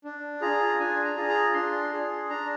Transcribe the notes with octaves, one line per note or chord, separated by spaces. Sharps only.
D4
F4 G#4 A#5
D4 G#5
A#5
F4 G#4
A#5
D4 C6
G#4
D4 A#5